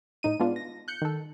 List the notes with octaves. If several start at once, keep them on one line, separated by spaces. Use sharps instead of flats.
A2 D#4 D#7
G#3 B3 D4 F4
A#6
F#6 G6 C#7
D#3 A4